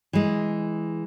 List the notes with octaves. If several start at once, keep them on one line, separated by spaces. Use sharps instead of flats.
E3 G#3